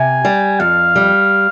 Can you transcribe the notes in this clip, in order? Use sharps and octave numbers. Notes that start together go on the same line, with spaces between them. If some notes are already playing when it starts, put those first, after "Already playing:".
Already playing: C3 G#5
G3
F2 F5
G3